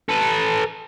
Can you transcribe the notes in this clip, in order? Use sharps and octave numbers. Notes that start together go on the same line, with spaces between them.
A4 B4